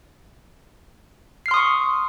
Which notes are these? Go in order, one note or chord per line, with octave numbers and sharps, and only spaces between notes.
C6 C#6 D#6 F6 C7